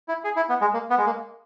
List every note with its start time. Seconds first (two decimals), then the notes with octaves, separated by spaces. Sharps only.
0.08 E4
0.24 G#4
0.36 E4
0.49 B3
0.61 G#3
0.74 A#3
0.90 B3
0.98 G#3
1.06 A#3